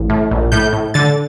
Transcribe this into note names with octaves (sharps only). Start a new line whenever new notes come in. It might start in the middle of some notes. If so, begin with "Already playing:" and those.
Already playing: A1
A2
A#1
A2 G6
A2
D3 A6